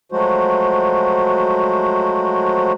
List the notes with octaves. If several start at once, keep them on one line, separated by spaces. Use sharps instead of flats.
F3 F#3 G#3 A3 F#4 C5